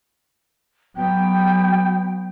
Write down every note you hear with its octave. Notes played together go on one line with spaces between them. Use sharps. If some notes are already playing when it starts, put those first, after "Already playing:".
F#3 B3 G5